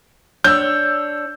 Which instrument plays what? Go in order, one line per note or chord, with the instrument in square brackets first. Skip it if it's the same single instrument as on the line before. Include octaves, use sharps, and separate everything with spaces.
[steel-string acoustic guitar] D4 C#5 [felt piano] E6 G6